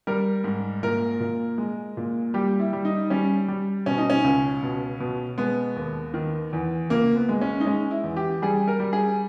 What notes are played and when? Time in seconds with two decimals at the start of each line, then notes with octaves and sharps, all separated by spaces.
0.07 G3 A#4
0.44 G#2
0.83 A#2 A#4
1.20 A#2
1.58 G#3
1.97 A#2
2.34 G3 G4
2.59 E4
2.73 G3
2.85 D#4
3.10 G3 C#4
3.48 G3
3.86 B2 C#4
3.98 D#4
4.10 C#4
4.24 C#2
4.63 B2
5.00 B2
5.38 G#3 B3
5.76 D#2
6.14 D#3
6.53 E2
6.90 C#2 A#3
7.16 B3
7.29 G#3
7.41 C#4
7.60 D#4
7.66 G#3 C#4
7.91 E4
8.04 E2
8.17 G4
8.42 G3 G#4
8.68 A#4
8.80 G3
8.93 G#4